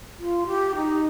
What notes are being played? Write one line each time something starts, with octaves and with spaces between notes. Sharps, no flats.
F4
G4
D#4